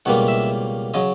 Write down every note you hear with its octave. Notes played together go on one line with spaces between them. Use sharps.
C#2 B2 G3 A#3 F#5
E5
C#3 F#3 D#5